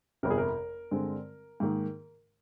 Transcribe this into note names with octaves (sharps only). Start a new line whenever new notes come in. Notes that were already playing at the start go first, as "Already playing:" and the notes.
G1 F2 C3 A#4
G#4
A#4
G2 D3 G#3 C4
G#2 D#3 A#3